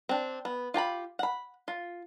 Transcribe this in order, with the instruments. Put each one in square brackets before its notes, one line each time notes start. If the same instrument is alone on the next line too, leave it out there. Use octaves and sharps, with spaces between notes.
[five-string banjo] C4 D4
B3
F4 G4 A5 B5
F#5 B5
F4